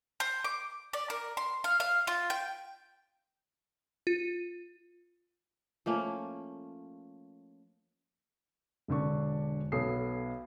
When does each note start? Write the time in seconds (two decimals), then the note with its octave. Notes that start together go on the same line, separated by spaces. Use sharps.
0.20 C5
0.44 D6
0.93 D5
1.10 A#4
1.37 C6
1.64 F5
1.80 F5
2.07 F4
2.30 G5
4.07 F4
5.86 F3 A3 A#3 C#4
8.88 E1 D3 D4 C#6
9.72 B1 B3 A4 C#5 D#6 C7